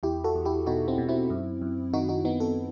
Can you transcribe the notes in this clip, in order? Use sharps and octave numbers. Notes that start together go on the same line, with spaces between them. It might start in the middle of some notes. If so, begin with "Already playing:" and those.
E2 E4 G4
F#4 A4
E2
E4 G4
B2 D#4 F#4
C4 E4
B2
C4 E4
F#2
F#2
D#3 D#4 F#4
D#4 F#4
D#3 B3 D#4
F#4 A4